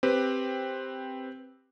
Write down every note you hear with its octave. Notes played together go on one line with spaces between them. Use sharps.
C4 G4 B4